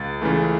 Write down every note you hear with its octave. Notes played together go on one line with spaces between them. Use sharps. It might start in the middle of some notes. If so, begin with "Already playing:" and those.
Already playing: C#2 A6
C#3 E3 A3